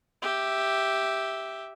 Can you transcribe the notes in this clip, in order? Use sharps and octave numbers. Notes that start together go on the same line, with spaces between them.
G4 E5